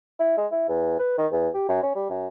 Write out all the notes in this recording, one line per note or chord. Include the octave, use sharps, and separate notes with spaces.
E4
G#3
E4
E2
B4
D#3
E2
G4
F#2
C#4
G3
F#2